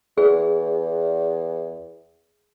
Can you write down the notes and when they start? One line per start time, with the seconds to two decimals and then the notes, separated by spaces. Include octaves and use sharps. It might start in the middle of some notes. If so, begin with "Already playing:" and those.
0.18 E2 G#4